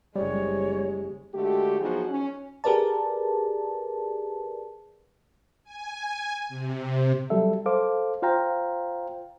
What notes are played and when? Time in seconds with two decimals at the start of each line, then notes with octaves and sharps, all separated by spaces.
0.16 F#1 C3 G3 G#3 C#5
1.35 D3 G#3 A3 F#4 G4
1.80 F3 F#3 B3 D#4 F#4 G#4
2.10 C#4
2.64 G4 G#4 A#4 B4 D5 A5
5.64 G#5
6.49 C3
7.30 F#3 G3 A4 E5
7.66 A4 C5 F5 D6
8.22 F4 C5 F5 G5 A#5